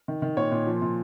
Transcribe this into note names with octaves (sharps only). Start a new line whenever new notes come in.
D#3
D#3
A#2 C#5
A#2
F3
A#2